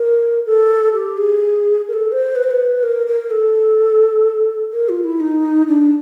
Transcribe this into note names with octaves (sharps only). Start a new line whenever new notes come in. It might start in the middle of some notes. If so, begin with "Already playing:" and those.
Already playing: A#4
A4
G4
G#4
A#4
A4
C5
B4
C5
B4
A#4
A#4
A4
A#4
F4
E4
D#4
D4